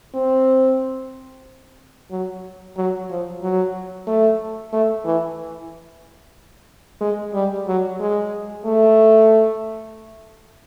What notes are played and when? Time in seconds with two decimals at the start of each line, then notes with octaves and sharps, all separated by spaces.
0.14 C4
2.11 F#3
2.76 F#3
3.10 F3
3.42 F#3
4.07 A3
4.73 A3
5.05 E3
7.01 G#3
7.34 G3
7.67 F#3
8.00 G#3
8.65 A3